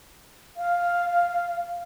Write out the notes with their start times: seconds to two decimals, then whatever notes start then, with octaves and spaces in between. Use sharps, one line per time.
0.57 F5